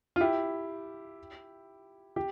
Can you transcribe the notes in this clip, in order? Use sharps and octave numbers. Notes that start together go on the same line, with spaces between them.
F4
E4 G4
G4